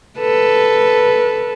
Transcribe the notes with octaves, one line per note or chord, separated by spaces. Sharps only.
A4 B4